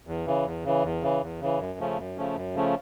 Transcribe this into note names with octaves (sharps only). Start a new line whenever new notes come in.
E2
C#3 E3
E2
C#3 E3
E2
C#3 E3
E2
C#3 E3
F#2
C#3 F3 A3 C#4
F#2
C#3 F3 A3 C#4
F#2
C#3 F3 A3 C#4